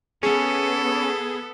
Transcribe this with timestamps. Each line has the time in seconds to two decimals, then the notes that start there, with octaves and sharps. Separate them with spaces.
0.23 B3 C#4 G#4 A4